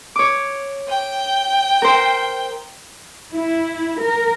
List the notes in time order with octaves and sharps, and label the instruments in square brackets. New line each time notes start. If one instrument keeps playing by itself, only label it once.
[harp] C#5 D6
[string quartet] G5
[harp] A#4 C5
[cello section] E4
A#4